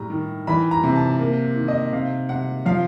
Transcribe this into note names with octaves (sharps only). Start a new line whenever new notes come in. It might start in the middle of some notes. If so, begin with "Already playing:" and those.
Already playing: A2 G3 A#5
D#3
E3 B5
A#5
C3
A5
A#3
D#3
D#5
C3 F5
C3 F#5
F3 F5